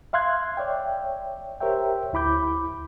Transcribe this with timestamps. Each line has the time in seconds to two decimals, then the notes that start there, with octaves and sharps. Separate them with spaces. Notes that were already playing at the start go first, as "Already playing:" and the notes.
0.13 E5 F5 C6 F#6 G#6
0.57 C#5 D5 E5 G5
1.61 G4 A#4 C5 C#5 E5 G5
2.13 D2 E4 B5 D6 G6